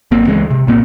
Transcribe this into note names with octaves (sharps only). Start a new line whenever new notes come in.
G#1 A#3 C4
C#2 E3 G#3
C3
B1 A#2 A#3 C4